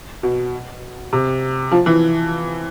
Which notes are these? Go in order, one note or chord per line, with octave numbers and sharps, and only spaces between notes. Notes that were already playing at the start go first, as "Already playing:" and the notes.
B2
C3
F3
E3